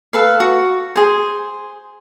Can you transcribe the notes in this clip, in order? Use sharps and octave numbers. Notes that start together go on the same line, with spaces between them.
A4 B4 F5
F#4
G#4 C5